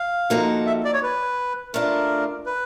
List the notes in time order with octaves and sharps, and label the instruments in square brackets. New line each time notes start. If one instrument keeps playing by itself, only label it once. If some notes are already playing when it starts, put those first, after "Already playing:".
Already playing: [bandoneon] F5
[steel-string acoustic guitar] F3 A#3 D#4 F#4 A4
[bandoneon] E5
D5
C#5
B4
[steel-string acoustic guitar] A3 D4 F4 [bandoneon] A#4
[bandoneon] B4